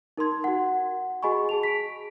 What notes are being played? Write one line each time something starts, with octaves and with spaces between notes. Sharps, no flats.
D#4 A#4 A5 C6 G#6
F#4 F#5
F#4 G#4 D#5 G#5 B5 C#6
G#4 A5 F7
B6 D7